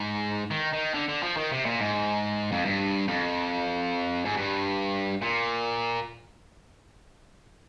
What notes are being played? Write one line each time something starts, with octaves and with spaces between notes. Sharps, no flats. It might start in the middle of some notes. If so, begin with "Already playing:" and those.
Already playing: G#2
D#3
D#3
D3
D3
F3
D#3
C3
A#2
G#2
F2
G2
F2
G#2
G2
A#2